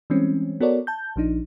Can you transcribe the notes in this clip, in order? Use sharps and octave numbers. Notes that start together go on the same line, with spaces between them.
E3 G3 G#3 C4 C#4
B3 F#4 A4 A#4 C#5 D5
A5 G6
A#1 F3 D4 D#4